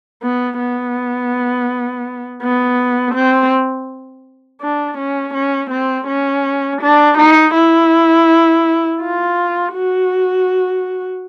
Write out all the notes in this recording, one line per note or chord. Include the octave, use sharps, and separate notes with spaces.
B3
B3
B3
C4
D4
C#4
C#4
C4
C#4
D4
D#4
E4
F4
F#4